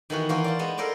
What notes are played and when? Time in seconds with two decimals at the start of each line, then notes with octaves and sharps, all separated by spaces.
0.10 D#3 E3 B3 F#4
0.29 E3 A#3 F#4 C5 G5
0.44 D5 F5 A5
0.59 G#3 B3 G#4
0.77 A4 A#4 C5 D5 D#5